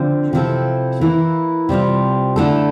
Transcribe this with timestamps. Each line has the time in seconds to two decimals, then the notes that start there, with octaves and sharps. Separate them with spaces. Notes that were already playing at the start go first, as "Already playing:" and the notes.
Already playing: D3 F3 C4
0.33 C3 F3 C4 E4 A4
1.01 E3 A#3 E4
1.69 C3 G3 C4 F4
2.36 D3 A3 E4 A4